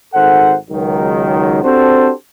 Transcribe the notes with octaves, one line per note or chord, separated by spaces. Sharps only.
G#1 D#3 A4 C5 F#5
C#2 D#3 F#3
C4 D4 F#4 G4 A4 C5